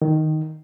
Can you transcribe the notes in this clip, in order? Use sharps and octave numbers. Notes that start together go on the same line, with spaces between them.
D#3